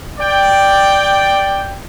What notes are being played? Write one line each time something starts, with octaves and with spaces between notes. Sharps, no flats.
D5 G5